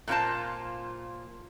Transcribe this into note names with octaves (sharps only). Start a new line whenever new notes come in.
A#2 A#3 F4 C5 A5